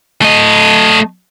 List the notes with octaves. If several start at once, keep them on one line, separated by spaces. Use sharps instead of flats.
A3 D#5